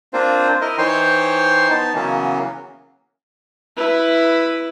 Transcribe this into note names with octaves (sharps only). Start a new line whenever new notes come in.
A#3 C4 D4 F4 C5
E4 A#4 D#5
E3 D#4 C5 C#5 G5 C6
B3 D#4 A5
C#3 E3 F#3 A#3 B3 C#4
E4 B4